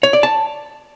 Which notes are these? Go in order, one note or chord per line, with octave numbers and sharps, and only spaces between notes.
C#5
D5
A5